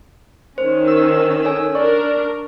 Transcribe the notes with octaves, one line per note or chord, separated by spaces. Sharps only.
D#3 C#4 C5
E6
A4 C#5 G#5
D4 A#4 D5 C#6